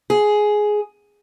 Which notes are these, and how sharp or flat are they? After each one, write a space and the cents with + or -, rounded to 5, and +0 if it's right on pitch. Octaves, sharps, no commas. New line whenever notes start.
G#4 +10